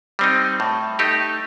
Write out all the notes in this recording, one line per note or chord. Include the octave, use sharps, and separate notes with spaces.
G3 C4 D#4
A2
A3 D#4 G4